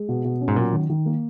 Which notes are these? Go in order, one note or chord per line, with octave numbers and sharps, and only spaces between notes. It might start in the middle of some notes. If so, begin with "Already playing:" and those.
Already playing: G#3
B2
B2
C#4
G#2
A#2 F#3
D#3
D#3
A#3